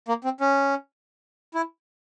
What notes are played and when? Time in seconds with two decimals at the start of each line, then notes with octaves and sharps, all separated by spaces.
0.08 A#3
0.24 C4
0.41 C#4
1.54 E4